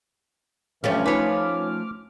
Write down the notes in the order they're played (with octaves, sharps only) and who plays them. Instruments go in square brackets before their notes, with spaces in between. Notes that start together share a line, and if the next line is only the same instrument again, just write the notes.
[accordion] G2 E3 F6 [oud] F3 A3 C#4 [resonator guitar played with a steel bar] G3
[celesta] D#4 F4 G#5 [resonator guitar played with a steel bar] B4 C#5 [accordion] D6 F6